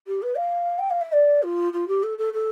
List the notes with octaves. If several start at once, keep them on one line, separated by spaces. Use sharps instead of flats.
G4
B4
F5
G5
F5
E5
D5
F4
F4
G4
A4
A4
A4